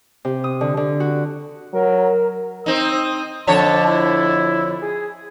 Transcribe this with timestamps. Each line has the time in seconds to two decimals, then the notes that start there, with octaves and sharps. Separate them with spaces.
0.25 C3
0.44 D#6
0.61 D3
0.77 D3
1.00 F#4
1.74 F#3 A#4
2.66 C4 D#4 D#6
3.47 F2 D3 C#5 A5
3.86 E4
4.81 G#4